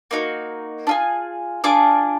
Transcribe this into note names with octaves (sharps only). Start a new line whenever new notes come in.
A#3 D#4 F#4
D4 F4 G#4
D4 F4 G#4 D6